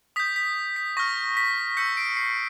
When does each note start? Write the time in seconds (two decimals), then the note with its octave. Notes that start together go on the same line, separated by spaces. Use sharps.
0.16 D#6 G6 B6
0.36 B6
0.76 B6
0.97 C#6 F6 A#6
1.37 B6
1.77 C#6 E6 G6 B6 C#7
1.97 C7 D7
2.17 C7